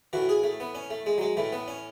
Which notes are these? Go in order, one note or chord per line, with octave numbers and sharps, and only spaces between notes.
A2 E3 F#4
G#4
A3
B3
C#4
A3
G#3
F#3
G#3
A2 E3 A3
B3
C#4